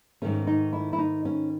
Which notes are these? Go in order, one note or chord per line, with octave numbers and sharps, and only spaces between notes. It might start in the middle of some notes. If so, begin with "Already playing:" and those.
G#2 D#3 A3 C#4
D#4
E4
E4
D#4
C#4